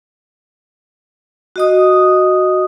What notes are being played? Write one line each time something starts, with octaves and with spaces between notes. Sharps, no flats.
F#4 D#5 D#6